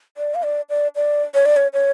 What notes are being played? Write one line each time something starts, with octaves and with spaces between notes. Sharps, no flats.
D5
F5
D5
D5
D5
C#5
D5
C#5
C#5